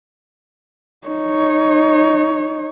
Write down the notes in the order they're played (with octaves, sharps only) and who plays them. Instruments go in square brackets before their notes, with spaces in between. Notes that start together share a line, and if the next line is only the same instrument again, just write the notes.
[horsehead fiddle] D#4 C#5